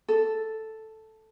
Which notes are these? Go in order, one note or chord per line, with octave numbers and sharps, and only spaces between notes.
A4